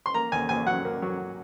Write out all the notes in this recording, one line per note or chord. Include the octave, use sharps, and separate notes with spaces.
C6
A#3 A#5
D#2 G#5
D#2 G#5
F#3 F#5
A#3
F#3